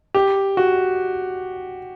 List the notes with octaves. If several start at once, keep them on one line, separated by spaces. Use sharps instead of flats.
G4
F#4